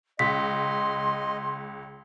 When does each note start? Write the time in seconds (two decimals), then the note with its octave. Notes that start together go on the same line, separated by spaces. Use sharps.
0.19 C#2 D#5 C6 B6